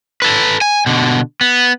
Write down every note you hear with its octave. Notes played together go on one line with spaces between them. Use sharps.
A4 B4
G#5
B2 D3
B3